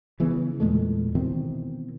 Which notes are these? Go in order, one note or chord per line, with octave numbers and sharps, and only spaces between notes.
C#3 E3 B3
E2 A#2 G#3 A3
B2 D#3 E3 C4